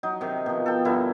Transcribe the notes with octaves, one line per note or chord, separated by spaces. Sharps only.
F#3 D#4
C3 D#3
B2 F3
A4 G5
G2 D3 E4 A#4